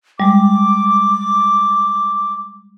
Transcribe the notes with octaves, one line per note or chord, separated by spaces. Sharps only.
G3 G#3 D6